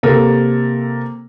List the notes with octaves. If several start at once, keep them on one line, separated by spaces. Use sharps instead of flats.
C3 A#3 A4 A#4